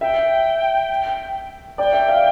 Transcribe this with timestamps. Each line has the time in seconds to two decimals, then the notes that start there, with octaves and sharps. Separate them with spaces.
0.01 E5 G5
1.78 D5 G5
1.93 E5
2.08 F5